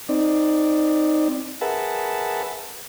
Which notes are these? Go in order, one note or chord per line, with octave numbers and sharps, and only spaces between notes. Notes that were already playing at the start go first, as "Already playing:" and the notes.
C4 D#4 D5
G#4 A#4 B4 E5 F#5 A5